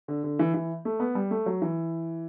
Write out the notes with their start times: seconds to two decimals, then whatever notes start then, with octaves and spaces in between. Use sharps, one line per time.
0.08 D3
0.24 D3
0.39 E3
0.54 E3
0.85 A3
1.00 B3
1.15 G3
1.31 A3
1.46 F#3
1.62 E3